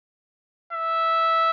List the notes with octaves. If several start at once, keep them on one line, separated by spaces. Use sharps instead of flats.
E5